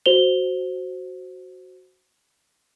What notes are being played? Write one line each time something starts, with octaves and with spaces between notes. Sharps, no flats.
F#4 C5 F7 G7